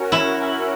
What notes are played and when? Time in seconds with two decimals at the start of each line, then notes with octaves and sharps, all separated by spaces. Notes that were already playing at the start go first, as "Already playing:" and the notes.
Already playing: C#4 F#4 A#4
0.12 E4